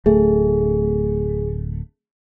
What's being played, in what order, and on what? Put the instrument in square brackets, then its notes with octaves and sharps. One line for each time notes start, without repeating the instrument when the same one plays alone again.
[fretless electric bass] D1 A3 [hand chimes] G#4